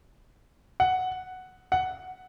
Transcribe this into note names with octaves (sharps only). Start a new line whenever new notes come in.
F#5
F#5